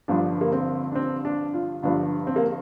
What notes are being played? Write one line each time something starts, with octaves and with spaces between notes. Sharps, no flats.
G1 G2 D3 F3 D4
A#3
C4
D4
C4
D4
F4
G1 G2 F3 D4
C4
A#3